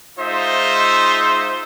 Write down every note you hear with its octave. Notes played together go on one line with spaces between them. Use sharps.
G#3 D#4 F4 C5 E5